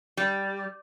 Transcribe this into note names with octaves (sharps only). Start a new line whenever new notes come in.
G3